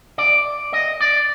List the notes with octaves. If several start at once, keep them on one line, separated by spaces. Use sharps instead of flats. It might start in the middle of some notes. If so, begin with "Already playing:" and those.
D5
D#5
D5